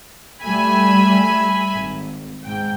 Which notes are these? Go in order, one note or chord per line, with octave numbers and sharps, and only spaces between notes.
G3 A3 E5 G#5 B5
G#1
G#2 G5